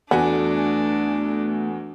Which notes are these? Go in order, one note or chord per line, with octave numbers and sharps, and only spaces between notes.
E2 A3 B3 D4 F#4 G#5